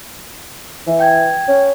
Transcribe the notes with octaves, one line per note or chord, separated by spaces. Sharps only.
E3
G5 G6 G#6
C#4